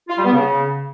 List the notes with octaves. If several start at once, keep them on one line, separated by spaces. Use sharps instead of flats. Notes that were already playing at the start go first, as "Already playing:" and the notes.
F4
G3
B3
C#3